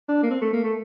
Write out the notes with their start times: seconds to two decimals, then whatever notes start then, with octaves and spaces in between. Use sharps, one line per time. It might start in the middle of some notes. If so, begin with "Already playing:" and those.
0.09 D4
0.23 A#3
0.30 C4
0.41 A3
0.53 A#3
0.64 A3